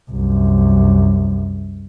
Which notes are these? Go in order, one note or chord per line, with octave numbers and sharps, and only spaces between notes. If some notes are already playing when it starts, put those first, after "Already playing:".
C2 F#2